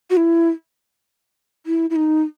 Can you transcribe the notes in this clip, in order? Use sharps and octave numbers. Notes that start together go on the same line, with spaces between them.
F#4
E4
E4
E4
D#4